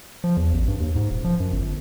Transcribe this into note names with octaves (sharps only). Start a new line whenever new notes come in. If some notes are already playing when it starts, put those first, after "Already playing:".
F3
E2
A1
G2
D#2
G#2
D#1
F3
F#2
G1